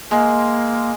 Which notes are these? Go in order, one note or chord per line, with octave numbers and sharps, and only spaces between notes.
G#3 A#3